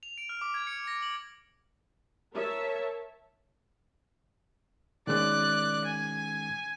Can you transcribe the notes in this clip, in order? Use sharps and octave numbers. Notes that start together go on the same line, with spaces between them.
F7
D7
F6
D6
G#6
C#7
A#6
F#7
A#4 C#5 E5 A5
D#3 G#3 C#4 D5 F#6
G#5